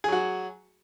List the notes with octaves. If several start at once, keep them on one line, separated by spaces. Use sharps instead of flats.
F#3 F#4 G#4